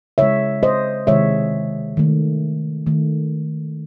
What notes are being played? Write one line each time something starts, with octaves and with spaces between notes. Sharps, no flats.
C#3 G#3 C#5 E5
C5 D#5
C3 D#3 G#3 C#5 E5
D#3 A3
D#3 A3